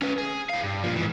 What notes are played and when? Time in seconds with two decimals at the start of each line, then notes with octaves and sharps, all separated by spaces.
0.02 C#4 B4
0.18 G#4
0.49 E3 F5
0.63 G2
0.83 A#2 F3
0.96 G#2 E3